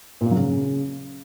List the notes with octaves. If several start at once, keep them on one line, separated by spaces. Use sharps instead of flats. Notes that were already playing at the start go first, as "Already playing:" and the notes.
A#2
A#3
F#3
C#3